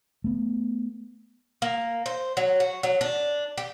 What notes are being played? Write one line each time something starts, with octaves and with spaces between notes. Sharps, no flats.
A3 B3
A#3
C5
F#3
F#4
F#3
D4
G4